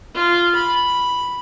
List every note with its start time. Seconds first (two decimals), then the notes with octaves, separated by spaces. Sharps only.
0.15 F4
0.55 B5